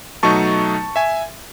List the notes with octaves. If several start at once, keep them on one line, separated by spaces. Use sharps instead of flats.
B2 F#3 A3 D#4 A5 C#6
E5 G#5